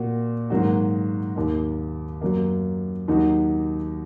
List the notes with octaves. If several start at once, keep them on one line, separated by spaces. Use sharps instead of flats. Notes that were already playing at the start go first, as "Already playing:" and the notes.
Already playing: A#2 A#3 F#4
G#2 D#3 F#3 A#3 F#4
D#2 D#3 A#3
F#2 F#3 A#3
D#2 D#3 F#3 D#4 F#4